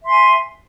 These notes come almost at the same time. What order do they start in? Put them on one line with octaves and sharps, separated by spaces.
E5 C6 G#5